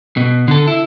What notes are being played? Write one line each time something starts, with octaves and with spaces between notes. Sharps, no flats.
B2
D3 A4
E4